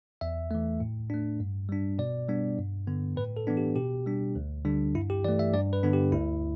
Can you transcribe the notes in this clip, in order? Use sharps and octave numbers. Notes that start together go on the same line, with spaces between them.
E2 E5
E3 A3
A2
A3 D4
G2
G3 D4
B2 D5
G3 B3 D4
G2
D3 B3
A2 B4
A4
E3 B3 D4
G4
B2 G4
G3 D4
D2
D3 G3 D4
G2 E4
G4
E3 A3 D5
E5
G2 D5
B4
D3 B3 D4
G4
D2 E4